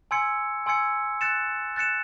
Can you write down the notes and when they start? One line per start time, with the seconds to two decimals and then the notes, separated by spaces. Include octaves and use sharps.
0.11 G#5 C6 E6 G#6 C#7
0.66 G#5 C6 E6 G#6 C#7
1.21 F#6 A6 C#7 E7
1.76 F#6 A6 C#7 E7